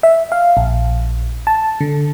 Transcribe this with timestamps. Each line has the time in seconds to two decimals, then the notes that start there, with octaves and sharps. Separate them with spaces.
0.03 E5
0.32 F5
0.57 A#1
1.47 A5
1.80 D3